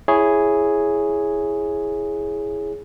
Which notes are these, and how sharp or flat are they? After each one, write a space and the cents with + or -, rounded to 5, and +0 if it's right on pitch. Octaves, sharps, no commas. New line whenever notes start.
E4 +0 G#4 +0 C#5 +0